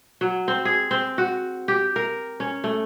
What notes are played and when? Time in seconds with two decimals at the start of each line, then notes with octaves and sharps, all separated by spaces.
0.21 F#3
0.48 C4
0.65 G#4
0.91 C4
1.18 F#4
1.68 G4
1.96 A#4
2.40 C#4
2.64 A3